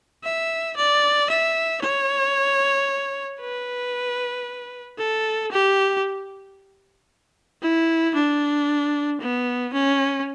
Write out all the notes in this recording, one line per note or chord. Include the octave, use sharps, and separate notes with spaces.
E5
D5
E5
C#5
B4
A4
G4
E4
D4
B3
C#4